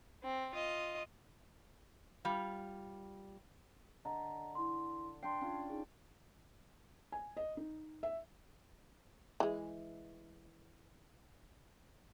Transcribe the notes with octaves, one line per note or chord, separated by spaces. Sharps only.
C4
F4 D#5
G3 F4
D3 D#5 A#5
E4 C6
D4 G5 C6 C7
C#4 D4 F4
D#4 G#4
G#5
D#5
D#4
E5
E3 G#3